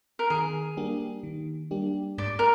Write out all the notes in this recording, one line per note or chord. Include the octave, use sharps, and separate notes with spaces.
A#4
D#3 G#4
G3 A#3 D4 G4
D#3
G3 A#3 D4 G4
G#2 D5
A#4